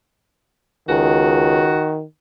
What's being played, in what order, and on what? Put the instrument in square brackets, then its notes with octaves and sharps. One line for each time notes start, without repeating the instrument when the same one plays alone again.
[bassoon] C#2 [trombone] D#3 [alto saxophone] F#4